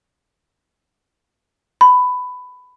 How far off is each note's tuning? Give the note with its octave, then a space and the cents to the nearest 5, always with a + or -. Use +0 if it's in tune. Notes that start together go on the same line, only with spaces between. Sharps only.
B5 +15